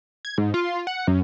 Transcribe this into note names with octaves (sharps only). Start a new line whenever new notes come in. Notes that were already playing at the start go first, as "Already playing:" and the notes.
G#6
G#2
F4
F#5
F#2